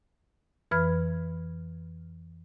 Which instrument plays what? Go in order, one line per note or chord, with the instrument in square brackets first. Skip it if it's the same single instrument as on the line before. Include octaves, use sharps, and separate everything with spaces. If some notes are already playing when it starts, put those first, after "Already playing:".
[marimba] F2 E3 B4 B5 F6 G#6